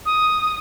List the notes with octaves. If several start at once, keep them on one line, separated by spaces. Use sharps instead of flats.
D#6